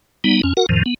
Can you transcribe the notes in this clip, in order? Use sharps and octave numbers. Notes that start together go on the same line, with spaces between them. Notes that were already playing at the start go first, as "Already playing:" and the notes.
G3 B3 D#4
F2 C#4
F#4 A#4 F#5
F2 A2 D#3 F3
B3